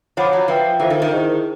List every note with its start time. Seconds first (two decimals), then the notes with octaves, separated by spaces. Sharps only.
0.17 F3 C#5 F#5 B5 D6
0.33 F#3
0.48 F3 B4 E5 G5
0.80 E3 F4 A4 C5 F5
0.90 D#3
1.02 D#3
1.12 E4 G#4 C5 D#5